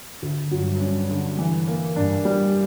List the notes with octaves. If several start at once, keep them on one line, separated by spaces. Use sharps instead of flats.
D2
G2 F#3
C#4
D3
E3
A#3
G2 D4
G3